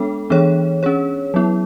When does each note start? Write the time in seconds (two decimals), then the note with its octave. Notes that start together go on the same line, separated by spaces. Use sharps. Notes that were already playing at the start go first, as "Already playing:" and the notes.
Already playing: G#3 B3 D4 A4
0.30 E3 B3 D4 G#4 C#5
0.83 C#4 G#4 C#5
1.34 F#3 B3 E4